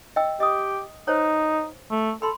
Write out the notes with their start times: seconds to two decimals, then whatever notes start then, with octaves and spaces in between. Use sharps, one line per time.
0.16 D#5 G5 E6
0.40 G4 D#5 D#6
1.08 D#4 C5 C#5
1.90 A3
2.22 A4 B5 C6